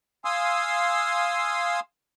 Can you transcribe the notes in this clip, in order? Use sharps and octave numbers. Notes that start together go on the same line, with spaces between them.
F5 G#5 C6 D#6 E6